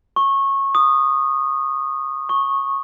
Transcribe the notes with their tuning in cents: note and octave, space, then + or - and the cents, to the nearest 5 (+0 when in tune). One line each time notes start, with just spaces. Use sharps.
C#6 -20
D#6 -15
C#6 -10